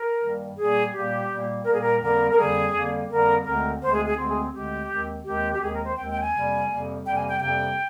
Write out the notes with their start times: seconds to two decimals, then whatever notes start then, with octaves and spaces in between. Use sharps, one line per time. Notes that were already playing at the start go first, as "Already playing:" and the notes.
Already playing: A#4
0.21 G2 D#3 G3 A#3
0.57 A#2 G3 A#3 G#4
0.92 A#2 G3 A#3 G4
1.29 A#2 G3 A#3
1.64 A#2 G3 A#3 A#4
1.72 G#4
1.80 A#4
2.00 F2 D3 G3 A#3 A#4
2.29 A#4
2.37 F2 D3 G3 A#3 G#4
2.73 F2 D3 G3 A#3
3.09 F2 D3 G3 A#3 A#4
3.44 D2 D3 G#3 C4 A#4
3.80 D2 D3 G#3 C4 C5
3.92 G#4
4.04 G#4
4.16 D2 D3 G#3 C4
4.29 G#4
4.53 D2 D3 G#3 C4 G4
4.88 D#2 D#3 G#3 C4
5.24 D#2 D#3 G#3 C4 G4
5.53 G4
5.60 D#2 D#3 G#3 C4 G#4
5.73 A#4
5.84 C5
5.96 D#2 D#3 G#3 C4 G5
6.09 G5
6.20 G#5
6.31 F2 C3 G3 A#3
6.68 F2 C3 G3 A#3
7.05 F2 C3 G3 A#3 G5
7.16 G#5
7.28 G5
7.39 F2 C3 G3 A#3 G5